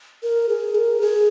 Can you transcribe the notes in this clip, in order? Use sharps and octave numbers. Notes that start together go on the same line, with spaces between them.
A#4
G#4
A#4
G#4